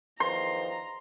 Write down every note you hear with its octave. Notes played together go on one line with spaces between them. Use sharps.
E2 D#3 F3 A#5 C6